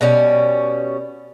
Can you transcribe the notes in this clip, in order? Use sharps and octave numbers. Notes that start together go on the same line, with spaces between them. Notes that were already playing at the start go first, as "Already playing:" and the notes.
B2 G3 C#4